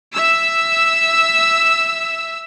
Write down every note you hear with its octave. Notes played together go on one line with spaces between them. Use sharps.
E5 E6